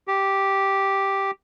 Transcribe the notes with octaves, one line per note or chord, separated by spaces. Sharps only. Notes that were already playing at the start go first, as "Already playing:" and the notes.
G4